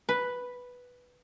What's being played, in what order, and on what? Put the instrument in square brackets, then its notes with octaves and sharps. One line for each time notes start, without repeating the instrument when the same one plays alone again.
[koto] B4